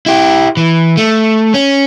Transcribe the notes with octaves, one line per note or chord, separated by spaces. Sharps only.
E4 G4
E3
A3
C#4